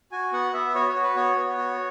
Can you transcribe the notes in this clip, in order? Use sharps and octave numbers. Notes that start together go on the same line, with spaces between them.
F#4 G#5
B3 F#5
B3 E5
F#4 C#5
C#5
F#4
B4
B3 C#5
B3
F#4